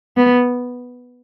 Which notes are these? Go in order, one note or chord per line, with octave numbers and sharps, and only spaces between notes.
B3